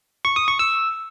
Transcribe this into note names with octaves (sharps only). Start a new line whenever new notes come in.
C#6
D#6
C#6
E6